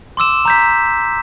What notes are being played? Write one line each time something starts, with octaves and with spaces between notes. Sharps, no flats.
C6 D6 E6 E7
A#5 G6 B6